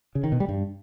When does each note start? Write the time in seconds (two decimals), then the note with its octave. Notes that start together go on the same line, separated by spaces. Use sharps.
0.15 C#3
0.24 D#3
0.32 B2
0.40 G3
0.49 G2